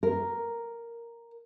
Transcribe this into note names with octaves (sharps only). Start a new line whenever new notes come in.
A#4